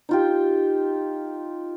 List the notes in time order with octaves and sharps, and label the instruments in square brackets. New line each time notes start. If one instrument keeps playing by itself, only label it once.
[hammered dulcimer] D#4 F4 G4